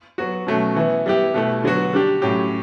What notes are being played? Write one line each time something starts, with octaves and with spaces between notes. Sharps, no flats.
F#3 B3 F#4
B2 F#3 A3 C#4
E3 B3 E4
G3 B3 E4 G4
B2 A3 E4
D3 F#3 B3 F#4
G3 D4 G4
A2 F#3 C#4 G4